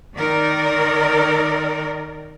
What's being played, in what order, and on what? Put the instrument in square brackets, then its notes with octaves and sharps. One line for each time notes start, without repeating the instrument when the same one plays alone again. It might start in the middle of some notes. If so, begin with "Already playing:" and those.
[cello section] D#3 D#4 A#4 D5